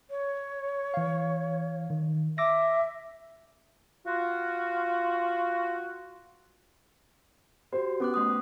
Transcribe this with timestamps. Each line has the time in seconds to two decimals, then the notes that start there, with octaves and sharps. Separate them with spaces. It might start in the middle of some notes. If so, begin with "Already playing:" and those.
0.10 C#5
0.94 E3 F5
1.90 D#3
2.38 E5 D6 E6 A#6
4.06 F4 F#4
7.72 F#4 G4 C5
8.00 B3 C#4 D6 F#6
8.14 A3 C6 D#6